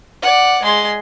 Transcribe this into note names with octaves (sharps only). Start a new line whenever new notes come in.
D5 F#5
G#3 C6